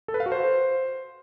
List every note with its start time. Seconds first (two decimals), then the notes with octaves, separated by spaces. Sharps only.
0.08 A4
0.14 B4
0.20 F5
0.26 F#4
0.32 C5